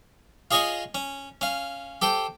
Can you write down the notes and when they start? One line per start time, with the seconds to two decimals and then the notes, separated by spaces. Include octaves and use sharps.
0.51 F4 G#4 C#5 D#5 G#5 C#6
0.95 C#4
1.41 C#4 F5
2.02 G4 A4 C5 G5